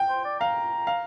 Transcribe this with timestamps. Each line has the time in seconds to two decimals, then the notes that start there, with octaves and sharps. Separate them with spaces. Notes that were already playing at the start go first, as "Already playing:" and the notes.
Already playing: G5
0.09 C5
0.25 D5
0.40 F5 A#5
0.87 F5